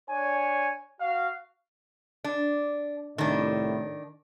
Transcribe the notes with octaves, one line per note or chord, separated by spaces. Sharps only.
D4 C#5 G#5
F#4 F5
D4
C2 A2 D#3 D4